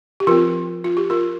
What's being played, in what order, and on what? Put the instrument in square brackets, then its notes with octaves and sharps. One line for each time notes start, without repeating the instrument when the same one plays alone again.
[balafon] G4
F3 C4 F4 A#4
F4
G4
F4 A#4